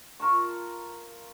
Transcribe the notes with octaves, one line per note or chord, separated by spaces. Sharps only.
F4 A#4 A5 C#6